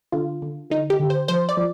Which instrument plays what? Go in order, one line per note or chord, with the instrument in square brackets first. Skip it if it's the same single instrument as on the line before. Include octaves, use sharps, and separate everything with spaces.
[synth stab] D3 F4
D3
D3 D#4
G4
D3
C5
F3 C5
D5
F3